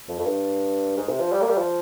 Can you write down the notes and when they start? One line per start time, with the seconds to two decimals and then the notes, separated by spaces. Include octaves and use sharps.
0.08 F2
0.19 F2
0.26 G2
0.97 G#2
1.09 C3
1.20 F3
1.32 G3
1.42 A#3
1.49 G3
1.58 F3